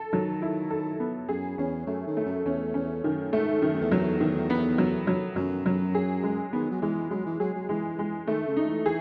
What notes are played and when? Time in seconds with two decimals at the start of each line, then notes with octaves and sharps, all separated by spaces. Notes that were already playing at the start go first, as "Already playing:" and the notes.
Already playing: A4
0.13 D#3 F#3
0.42 E4
0.70 A4
1.00 B3
1.28 F#2 G#4
1.58 E2 C#4
1.86 F#2 A3
2.07 D#3
2.17 A3
2.26 F#2
2.45 E2 C#4
2.74 E2 C#4
3.04 F#2 D#3
3.33 G#2 A3
3.61 F#2 D#3
3.74 F#2
3.81 E2
3.91 F#3
4.01 E2
4.20 D#3
4.50 B3
4.78 F#3
5.07 F#3
5.36 F#2 F#3
5.66 F#2 F#3
5.95 G#4
6.23 G#3
6.53 D#3 B3
6.71 F#3
6.82 E3 G#3
7.11 F#3 G#3
7.26 E3
7.40 F#3 G#4
7.54 F#3
7.69 E3 G#3
7.99 G#3
8.27 D#3 A3
8.48 C#3
8.57 D#4
8.67 E3
8.86 E3 G#4